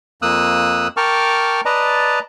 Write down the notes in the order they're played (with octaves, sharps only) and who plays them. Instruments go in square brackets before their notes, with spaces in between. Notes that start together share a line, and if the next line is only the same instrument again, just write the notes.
[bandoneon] F2 A#3 D#6 E6 F#6
A#4 G5 A5 C#6 D6 F6
B4 D5 D#5 A5 A#5